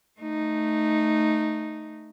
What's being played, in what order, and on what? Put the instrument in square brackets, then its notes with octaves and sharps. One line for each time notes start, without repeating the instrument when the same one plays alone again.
[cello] A3 D#4